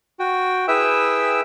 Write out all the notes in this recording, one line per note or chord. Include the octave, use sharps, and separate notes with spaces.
F#4 G5
E4 G#4 B4 E5 G5 E6